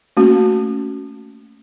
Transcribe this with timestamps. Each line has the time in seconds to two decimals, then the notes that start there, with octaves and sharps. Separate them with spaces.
0.17 A3 A#3 C#4 F#4